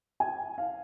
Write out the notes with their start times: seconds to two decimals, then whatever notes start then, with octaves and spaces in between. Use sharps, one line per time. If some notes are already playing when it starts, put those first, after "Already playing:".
0.20 G#5
0.58 F5